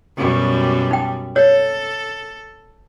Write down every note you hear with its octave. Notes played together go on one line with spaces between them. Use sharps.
F#2 B2 G3
D#4 G5
A4 C#5